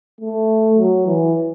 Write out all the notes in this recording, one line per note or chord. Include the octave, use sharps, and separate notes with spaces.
A3
F#3
E3